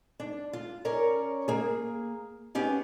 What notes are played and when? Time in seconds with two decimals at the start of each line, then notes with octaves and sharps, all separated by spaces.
0.20 D4
0.53 F4
0.85 C#4 A#4 C#5 D5
1.48 A#3 G#4
2.55 B3 C#4 G4 G#4